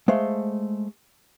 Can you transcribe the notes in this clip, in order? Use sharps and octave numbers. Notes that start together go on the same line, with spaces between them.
G#3 A3 C5 F5